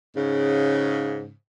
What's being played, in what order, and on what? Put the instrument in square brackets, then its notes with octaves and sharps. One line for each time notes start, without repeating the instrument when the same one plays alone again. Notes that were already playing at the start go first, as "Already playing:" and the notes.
[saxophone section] G#2 C#3